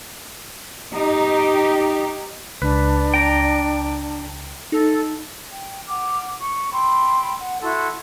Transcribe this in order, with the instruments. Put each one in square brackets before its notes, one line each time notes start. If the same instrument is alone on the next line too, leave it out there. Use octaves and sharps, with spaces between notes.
[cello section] D#4 G4
[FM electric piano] C#2 [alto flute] D4 [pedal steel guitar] B4
[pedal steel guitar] G5 A#5
[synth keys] D#4 [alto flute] A4
[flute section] G5
F#5 D6 F6
C#6
G5 B5 C6 E6
F#5
E4 F#4 A4 C6